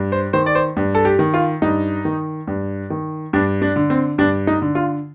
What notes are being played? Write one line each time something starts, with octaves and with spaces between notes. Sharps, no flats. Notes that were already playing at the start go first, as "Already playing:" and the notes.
Already playing: G2
C5
D#3 C5
D5
C5
G2
A4
G4
D#3
F4
G2 D#4
D#3
G2
D#3
G2 D4
D4
D3
C4
G2 D4
D#4
D3
F4